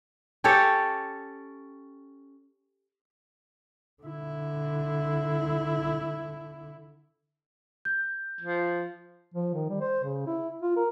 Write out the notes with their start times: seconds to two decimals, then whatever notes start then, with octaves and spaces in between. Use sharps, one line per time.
0.44 C#4 G4 A4 C#5
4.03 D3 E4
7.85 G6
8.41 F3
9.34 F3
9.54 D#3
9.69 G3
9.81 C5
10.04 C#3
10.26 E4
10.62 F4
10.76 A#4